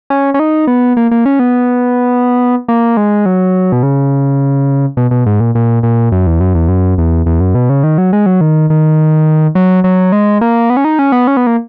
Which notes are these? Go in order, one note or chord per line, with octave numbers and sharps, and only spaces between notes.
C#4
C#4
D#4
B3
A#3
A#3
C#4
B3
A#3
G#3
F#3
B2
C#3
B2
B2
G#2
A#2
A#2
A#2
F#2
E2
F#2
E2
F#2
E2
E2
F#2
B2
C#3
D#3
F#3
G#3
F#3
D#3
D#3
F#3
F#3
G#3
A#3
B3
C#4
D#4
C#4
B3
C#4
B3
A#3